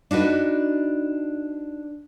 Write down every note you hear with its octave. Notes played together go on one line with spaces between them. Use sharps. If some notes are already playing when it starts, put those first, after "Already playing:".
D4 D#4 F#4 B4